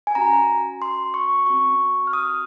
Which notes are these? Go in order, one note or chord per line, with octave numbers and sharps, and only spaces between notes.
G#5
C#4 F#4 A#5
C6
C#6
C4 F#4 C#6
F6
D#6